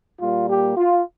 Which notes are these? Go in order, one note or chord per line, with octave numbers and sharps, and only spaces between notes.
A#2 G3 A#3 F4
G4
F4